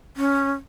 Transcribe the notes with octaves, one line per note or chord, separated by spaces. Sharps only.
C#4